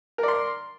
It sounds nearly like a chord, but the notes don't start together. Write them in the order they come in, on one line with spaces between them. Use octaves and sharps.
A#4 D5 C6